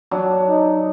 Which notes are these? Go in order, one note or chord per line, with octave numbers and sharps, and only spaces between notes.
F#3 D4
D#4